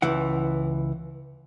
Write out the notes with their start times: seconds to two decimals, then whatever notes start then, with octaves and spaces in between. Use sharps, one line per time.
0.02 C#2 E3 F#5